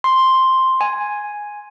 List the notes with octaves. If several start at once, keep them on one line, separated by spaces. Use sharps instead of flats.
C6
G#5